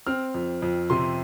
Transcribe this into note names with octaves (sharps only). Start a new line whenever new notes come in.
C4 F6
F2
F2
C3 C6